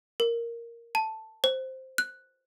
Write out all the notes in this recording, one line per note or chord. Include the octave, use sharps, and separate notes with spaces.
A#4
A5
C5
F#6